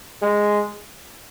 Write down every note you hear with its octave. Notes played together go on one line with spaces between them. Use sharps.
G#3